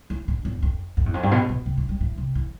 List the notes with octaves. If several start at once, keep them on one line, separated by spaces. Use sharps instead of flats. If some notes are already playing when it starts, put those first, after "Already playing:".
E3
D3
E2
F2
F2
E2
F2
G2
B2
B2
C3
E3
G3
E3
C3
E3